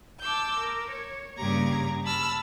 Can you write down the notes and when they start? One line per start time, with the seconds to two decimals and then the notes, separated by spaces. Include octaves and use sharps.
0.21 A5 D6 E6 G6
0.59 A#4
0.91 C#5
1.38 G2 C#3 A#3 G4 A#5 G#6
2.03 A5 B5 E6 F6